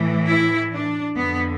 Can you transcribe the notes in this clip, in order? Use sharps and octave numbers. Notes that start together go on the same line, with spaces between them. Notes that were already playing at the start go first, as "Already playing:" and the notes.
Already playing: A2 E3
E4
D4
F2 D3 B3